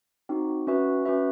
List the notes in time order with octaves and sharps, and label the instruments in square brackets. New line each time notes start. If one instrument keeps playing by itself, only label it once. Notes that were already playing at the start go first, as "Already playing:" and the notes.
[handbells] C4 D#4 F#4
C#4 F#4 B4 E5
C#4 F#4 B4 E5